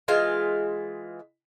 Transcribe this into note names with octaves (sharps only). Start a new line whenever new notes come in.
E3 G#3 F4 F5